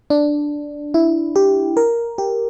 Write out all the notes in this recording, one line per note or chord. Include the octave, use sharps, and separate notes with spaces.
D4
E4
G4
A#4
G4